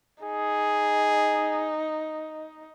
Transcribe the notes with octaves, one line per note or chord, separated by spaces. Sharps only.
D#4 G#4